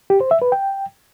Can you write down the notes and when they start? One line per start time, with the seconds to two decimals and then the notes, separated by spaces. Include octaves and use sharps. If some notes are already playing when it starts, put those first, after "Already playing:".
0.10 G4
0.21 C5
0.31 E5
0.42 B4
0.52 G5